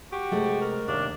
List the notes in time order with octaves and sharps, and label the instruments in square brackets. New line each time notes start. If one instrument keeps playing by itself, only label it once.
[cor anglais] F#4 [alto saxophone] G4
[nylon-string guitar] C3 G#3 A3
[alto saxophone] A#4
[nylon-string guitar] D#2 C3 [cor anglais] D4